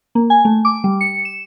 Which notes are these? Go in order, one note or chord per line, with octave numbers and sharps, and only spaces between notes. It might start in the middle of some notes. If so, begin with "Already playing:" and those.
A#3
G#5
A3
D6
G3
C#7
E7